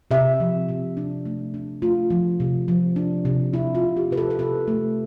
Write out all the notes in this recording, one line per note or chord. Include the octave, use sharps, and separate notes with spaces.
C3 E5
F3
C3
D4
A3
D4
A3 F4
F3
C3
F3
D4
C3
C3 E4
F4
C3
G4
C3 B4
A4
A4
C3 B4
A3